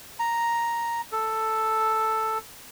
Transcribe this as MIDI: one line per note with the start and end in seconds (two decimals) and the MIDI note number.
0.20 1.01 82
1.12 2.38 69